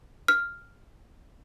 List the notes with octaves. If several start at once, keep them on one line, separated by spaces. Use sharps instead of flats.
F6